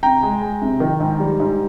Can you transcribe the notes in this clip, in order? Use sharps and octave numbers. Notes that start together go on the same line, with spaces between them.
C3 G5 A#5
G#3
G#3
C3
D#3
G#2
G3
G#2